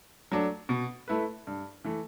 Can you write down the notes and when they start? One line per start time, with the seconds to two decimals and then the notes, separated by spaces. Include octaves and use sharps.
0.32 F#3 A3 D4
0.69 B2
1.08 A3 E4 B4
1.47 G2
1.84 E3 A3